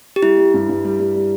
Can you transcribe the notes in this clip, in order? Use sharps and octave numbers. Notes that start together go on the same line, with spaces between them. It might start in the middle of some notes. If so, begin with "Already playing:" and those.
G4
G3 E4
G3
G2
G2
G3
G3
G3